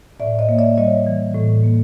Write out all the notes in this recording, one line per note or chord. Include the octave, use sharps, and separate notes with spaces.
A2 D5 E5
C#5 D#5
A#3
D5 E5
G3 C#5 D#5
E3
A2
A#3